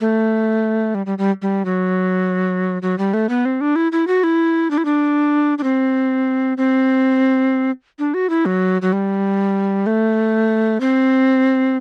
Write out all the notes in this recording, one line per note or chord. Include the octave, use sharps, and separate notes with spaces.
A3
G3
G3
G3
G3
F#3
F#3
G3
A3
B3
C4
D4
E4
E4
F#4
E4
D4
E4
D4
D4
C4
C4
D4
F#4
E4
F#3
F#3
G3
A3
C4